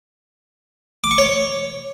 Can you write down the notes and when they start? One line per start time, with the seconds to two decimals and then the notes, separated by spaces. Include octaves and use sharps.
1.04 D6
1.11 C#6
1.18 C#5